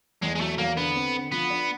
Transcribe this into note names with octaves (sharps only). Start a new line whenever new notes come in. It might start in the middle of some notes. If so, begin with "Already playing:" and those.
E2 G#3
G#3
F#3 A3
E2 A#3
D3 B3
C4
D3
F3 B3
D4